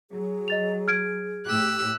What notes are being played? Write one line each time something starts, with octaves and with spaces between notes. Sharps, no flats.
F#3 G#4
D#5 A6 F7
F6 G#6 D7
A2 G4 E6 F#6